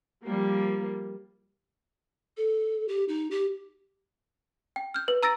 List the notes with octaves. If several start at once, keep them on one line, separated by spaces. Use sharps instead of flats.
F3 G3 A#3
A4
G4
D#4
G4
G5
F6 G6
B4
A#5 E6 A6 A#6 D7